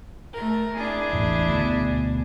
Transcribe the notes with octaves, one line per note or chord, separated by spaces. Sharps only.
A3 A#4
D4 E4 G#4
E1 A1
D2 B2